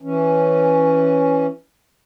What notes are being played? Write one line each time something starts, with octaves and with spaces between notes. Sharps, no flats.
E3 C#4